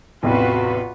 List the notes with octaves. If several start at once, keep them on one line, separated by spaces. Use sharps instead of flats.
A1 E2 C3 F4 F#4 B4